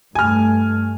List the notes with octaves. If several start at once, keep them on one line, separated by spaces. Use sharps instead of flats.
G2 A3 G#5 F6